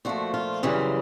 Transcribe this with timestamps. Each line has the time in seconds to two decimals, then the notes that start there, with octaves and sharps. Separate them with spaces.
0.05 A#2 F3 A3 F#4
0.34 F4
0.63 F#2 C#3 E3 G3